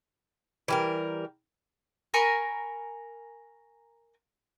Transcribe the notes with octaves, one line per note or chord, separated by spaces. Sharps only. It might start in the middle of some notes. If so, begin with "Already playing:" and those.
E3 G3 A#4
A#4 G#5 B5 C#6